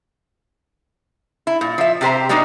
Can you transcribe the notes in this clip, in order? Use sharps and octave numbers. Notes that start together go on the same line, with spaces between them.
E4
A#2
F3 E5
C3 G4 C5 A#5
G3 G#3 A#3 D4 D#4 F#4